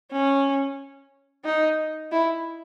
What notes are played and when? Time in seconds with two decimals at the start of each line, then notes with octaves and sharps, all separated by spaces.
0.12 C#4
1.45 D#4
2.12 E4